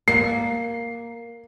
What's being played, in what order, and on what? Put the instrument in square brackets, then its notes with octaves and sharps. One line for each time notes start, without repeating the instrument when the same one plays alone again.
[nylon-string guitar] A#3 [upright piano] C7